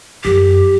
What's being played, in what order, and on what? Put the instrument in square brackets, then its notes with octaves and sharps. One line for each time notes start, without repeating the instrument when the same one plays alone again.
[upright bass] F#2 [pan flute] G4